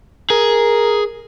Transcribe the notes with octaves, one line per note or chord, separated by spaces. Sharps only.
G#4 A#4